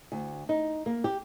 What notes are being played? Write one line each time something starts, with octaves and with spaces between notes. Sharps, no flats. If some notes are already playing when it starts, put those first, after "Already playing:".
D2
D#4
A#3
G4